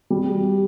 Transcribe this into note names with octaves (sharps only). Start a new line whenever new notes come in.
G3